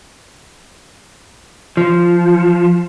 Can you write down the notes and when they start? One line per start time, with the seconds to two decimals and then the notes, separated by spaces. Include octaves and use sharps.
1.77 F3